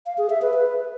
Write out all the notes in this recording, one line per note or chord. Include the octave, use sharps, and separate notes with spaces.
F5
G#4
E5
B4
B4